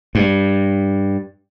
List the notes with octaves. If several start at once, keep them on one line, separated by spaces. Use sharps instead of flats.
G2